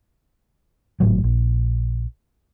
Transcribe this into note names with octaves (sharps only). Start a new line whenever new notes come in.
G#1 A2 F#3
A#1